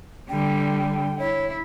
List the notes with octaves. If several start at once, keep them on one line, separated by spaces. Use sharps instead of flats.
D3 G3 G5
E4 C#5